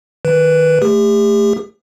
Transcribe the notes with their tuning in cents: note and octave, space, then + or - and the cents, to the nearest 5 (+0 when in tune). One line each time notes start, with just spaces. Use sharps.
D#3 +0 B4 +0
A3 +0 G4 +40